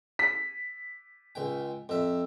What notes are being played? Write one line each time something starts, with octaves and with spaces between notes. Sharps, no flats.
B6
C#2 G5
F2 E5